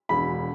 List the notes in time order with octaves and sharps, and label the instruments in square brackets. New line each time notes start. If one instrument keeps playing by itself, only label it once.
[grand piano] E1 [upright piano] B5